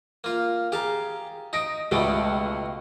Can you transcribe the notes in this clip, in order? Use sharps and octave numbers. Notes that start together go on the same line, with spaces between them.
A#3 F4
G4 G#4 F5 A5 A#5
D#4 D#6 A#6 D7
C#2 B2 G3 A3 C#6 D7